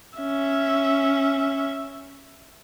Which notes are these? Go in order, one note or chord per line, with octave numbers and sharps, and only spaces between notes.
C#4 E5